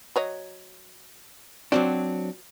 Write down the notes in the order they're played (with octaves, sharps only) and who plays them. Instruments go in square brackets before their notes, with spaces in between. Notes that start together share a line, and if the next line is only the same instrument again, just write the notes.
[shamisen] F#3 C#5 D#5
[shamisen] F3 F#4 D5 [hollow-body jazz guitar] F#3 C4 D4